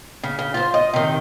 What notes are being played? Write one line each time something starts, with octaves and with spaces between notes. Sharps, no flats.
C#3
C#3
F4 C5
D#5
C3 D#3